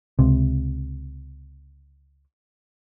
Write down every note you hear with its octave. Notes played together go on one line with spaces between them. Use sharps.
C#2 C3